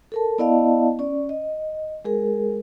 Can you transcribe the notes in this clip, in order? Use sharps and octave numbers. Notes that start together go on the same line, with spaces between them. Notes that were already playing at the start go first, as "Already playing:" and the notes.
A4 A#4 A5
B3 E4 D5 D#5 F5 A5
C#4 D5
D#5
G#3 G#4 A#4